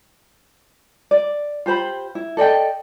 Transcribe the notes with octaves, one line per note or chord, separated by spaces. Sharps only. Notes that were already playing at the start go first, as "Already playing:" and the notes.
D5
F4 G4 C5 B5
E4
A4 D5 D#5 G5